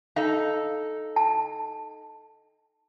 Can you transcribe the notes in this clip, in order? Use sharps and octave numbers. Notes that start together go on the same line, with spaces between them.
D#4 A4 F5
A5